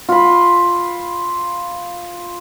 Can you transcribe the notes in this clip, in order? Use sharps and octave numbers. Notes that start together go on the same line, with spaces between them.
F4 B5